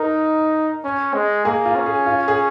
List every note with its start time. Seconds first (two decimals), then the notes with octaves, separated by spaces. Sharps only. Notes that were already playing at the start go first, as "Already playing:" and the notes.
Already playing: D#4 A#4
0.84 C#4
1.14 G#3
1.45 A#3 G#4
1.65 F4
1.76 C#4
1.86 G#4
2.06 F4
2.28 G#4